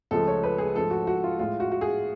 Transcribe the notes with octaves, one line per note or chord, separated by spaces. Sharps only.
C#2 C#3 F3 A3 A4
C#5
B4
G#4
G#2 F3 A3 A4
F#4
F#4
F4
A2 G#3 F4
F#4
F#4
G#4